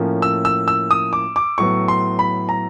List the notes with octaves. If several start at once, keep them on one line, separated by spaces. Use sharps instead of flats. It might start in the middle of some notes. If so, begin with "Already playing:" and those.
Already playing: A2 F3 A#3 C#4
E6
E6
E6
D#6
D6
D6
A2 F#3 B3 C#6
C6
B5
A#5